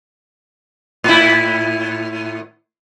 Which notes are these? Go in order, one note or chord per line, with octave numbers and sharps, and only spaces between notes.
A2 E4